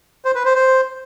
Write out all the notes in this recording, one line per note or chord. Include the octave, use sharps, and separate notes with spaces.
C5
B4
C5
C5